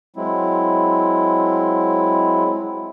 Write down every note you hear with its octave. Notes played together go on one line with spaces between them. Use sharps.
F#3 G#3 C4 E4